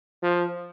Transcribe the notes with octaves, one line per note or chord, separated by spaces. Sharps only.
F3